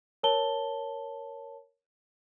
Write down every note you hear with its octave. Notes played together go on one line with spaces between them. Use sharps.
A#4 C#5 A5 G7